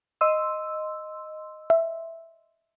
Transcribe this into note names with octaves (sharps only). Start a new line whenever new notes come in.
D#5 C6 E6
E5